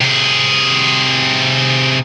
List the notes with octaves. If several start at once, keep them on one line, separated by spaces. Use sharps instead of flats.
C3 G#4